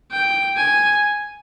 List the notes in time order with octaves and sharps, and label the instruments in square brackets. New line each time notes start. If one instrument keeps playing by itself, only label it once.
[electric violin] G5
G#5